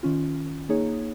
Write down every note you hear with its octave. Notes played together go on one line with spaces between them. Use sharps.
D#3 C#4 F4
A#3 D#4 G#4 C#5